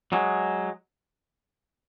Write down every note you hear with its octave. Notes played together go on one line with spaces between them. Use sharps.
F#3 G#3